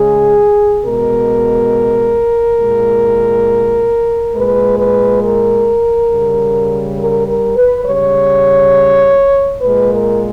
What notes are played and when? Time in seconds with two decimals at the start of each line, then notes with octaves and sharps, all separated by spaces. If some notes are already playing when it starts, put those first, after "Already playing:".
Already playing: C#3 G#3 G#4
0.82 B2 G#3 A#4
2.58 A#2 G#3
4.34 A#2 G#3 B4
4.78 B4
5.22 A#4
6.09 C#3 G3
6.97 A#4
7.27 A#4
7.56 B4
7.85 C#3 G3 C#5
9.61 A#2 G#3 B4
9.91 A#4